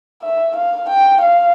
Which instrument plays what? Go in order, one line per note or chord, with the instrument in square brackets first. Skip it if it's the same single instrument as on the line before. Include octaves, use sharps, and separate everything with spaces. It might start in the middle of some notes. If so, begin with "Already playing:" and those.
[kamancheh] E5
F5
G5
F5